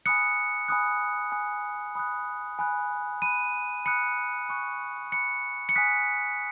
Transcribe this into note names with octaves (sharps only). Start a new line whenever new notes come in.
G#5 B5 D#6 F#6 C#7
G#5 B5 D#6 F#6
G#5 D#6 F#6
B5 D#6 F#6
G#5 B5 F#6
B5 F#6 D#7
B5 D#6 F#6 C#7
G#5 C#6 F#6
B5 F#6 C#7
C#7
G#5 D#6 F#6 B6